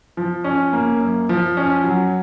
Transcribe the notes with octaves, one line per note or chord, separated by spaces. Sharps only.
F3
C#4
A#3
F#2
F3
C#4
F#3